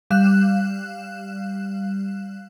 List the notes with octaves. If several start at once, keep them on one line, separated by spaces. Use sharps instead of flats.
G3 F5 F#6 E7